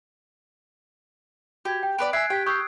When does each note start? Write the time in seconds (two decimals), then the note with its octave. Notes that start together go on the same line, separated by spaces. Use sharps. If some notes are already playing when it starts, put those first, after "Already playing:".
1.65 F#4 G4 G#6
1.83 G5
1.98 B3 B4 D5 D7
2.13 E5 G#5 F#6 G#6 C7
2.30 G4 G5 B6
2.46 G4 C#6 D#6 E6 C7